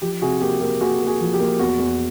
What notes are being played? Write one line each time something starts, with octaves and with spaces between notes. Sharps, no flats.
F3 G4
C3 F#4 G#4
A#3 G4
A#3 G4
A#3 F#4 G#4
A#3
F#4 G#4
F3
G4
A#3
E2 F#4
E2